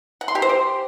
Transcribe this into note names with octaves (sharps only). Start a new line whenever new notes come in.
F#5
C6
G4
C5
G4